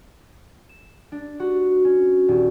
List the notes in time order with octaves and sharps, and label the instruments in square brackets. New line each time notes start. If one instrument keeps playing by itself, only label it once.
[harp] E7
D4
F#4
C#4
D#1